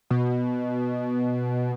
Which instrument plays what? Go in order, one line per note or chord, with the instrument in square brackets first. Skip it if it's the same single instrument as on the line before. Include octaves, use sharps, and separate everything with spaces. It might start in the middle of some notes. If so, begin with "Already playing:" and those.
[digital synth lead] B2